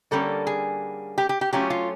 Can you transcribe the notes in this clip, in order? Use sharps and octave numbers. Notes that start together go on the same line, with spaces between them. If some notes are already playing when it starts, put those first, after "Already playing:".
D3 G3 A#3 C#4 A4
G#4
G4
G4
G4
F#3 A3 C#4 F4 G4
F4